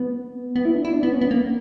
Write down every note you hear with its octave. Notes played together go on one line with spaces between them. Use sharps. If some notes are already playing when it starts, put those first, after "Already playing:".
Already playing: B3
B3
E4
D4
E4
D4
B3
C#4
B3
A#3